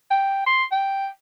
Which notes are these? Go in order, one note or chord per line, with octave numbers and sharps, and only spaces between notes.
G5
C6
G5